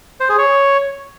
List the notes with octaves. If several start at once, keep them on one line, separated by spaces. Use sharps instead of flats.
C5
G#4
C#5